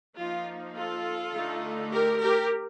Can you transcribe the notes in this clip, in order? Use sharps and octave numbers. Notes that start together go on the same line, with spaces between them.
F3 A#3 D#4 F4
F4 A4
D3 A3 D#4
G4 A#4
G4 A#4